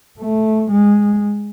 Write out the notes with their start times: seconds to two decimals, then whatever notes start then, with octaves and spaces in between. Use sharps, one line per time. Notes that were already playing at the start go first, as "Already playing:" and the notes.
0.20 A3
0.71 G#3